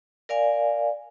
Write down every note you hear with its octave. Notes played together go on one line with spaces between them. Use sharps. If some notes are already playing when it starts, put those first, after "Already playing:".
A#4 D5 F5 G#5